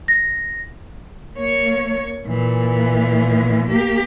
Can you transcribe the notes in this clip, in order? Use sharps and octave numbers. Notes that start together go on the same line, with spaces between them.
A#6
A#3 C#5
A#2 E3
A#3 G4